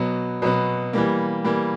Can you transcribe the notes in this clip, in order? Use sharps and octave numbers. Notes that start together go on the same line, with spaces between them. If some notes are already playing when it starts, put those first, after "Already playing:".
Already playing: B2 F#3 B3
B2 F#3 B3
E3 G3 A#3
E3 G3 A#3